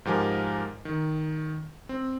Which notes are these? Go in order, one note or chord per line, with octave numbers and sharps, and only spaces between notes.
G#2 F3 G4 A#4 G#5
D#3
C4